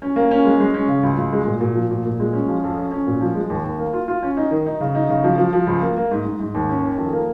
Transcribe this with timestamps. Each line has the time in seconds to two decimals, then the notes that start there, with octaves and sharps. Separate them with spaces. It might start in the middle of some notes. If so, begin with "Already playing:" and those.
0.02 C#4
0.16 A#3
0.31 C#4
0.45 G#3
0.60 G#3
0.74 C#4
0.88 C#3
1.03 C#2
1.18 C#2
1.33 G#3
1.46 A#2
1.61 A#2
1.75 F3
1.91 A#2
2.05 A#2
2.20 G#3
2.33 C#4
2.48 F3
2.63 F2
2.77 C#4
2.92 C#4
3.07 A#2
3.21 F3
3.35 G#3
3.50 D#2
3.64 D#2
3.79 A#3
3.93 F4
4.08 F4
4.23 C#4
4.37 D#4
4.51 D#3
4.66 D#4
4.81 C#3
4.95 D#4
5.10 C#3
5.24 F3
5.38 F3
5.53 F3
5.67 C#2
5.82 A#3
5.97 A#3
6.11 G#2
6.25 G#2
6.40 G#2
6.55 D#2
6.69 C#4
6.83 D#3
6.98 F2
7.13 A#3